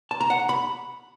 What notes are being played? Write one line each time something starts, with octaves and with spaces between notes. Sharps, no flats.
A5
A#5
F#5
A#5
B5